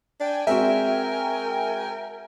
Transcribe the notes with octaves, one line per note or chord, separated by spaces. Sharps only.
D4 G5 G#5
G#3 C4 F#4 A#4 E5